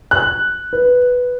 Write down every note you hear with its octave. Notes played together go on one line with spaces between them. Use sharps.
F#6
B4